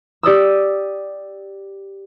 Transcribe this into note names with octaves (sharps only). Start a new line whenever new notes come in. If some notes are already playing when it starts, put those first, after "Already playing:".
G4 D5 D#6 E6